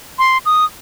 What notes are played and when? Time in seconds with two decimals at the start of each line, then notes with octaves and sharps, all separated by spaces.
0.19 C6
0.46 D#6